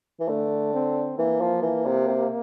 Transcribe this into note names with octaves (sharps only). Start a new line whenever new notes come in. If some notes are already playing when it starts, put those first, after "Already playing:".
E3
D3 A3
C4
E3 A#3
F3
E3
C3
C3